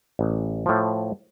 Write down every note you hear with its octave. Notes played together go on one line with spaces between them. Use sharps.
A1
A2 F3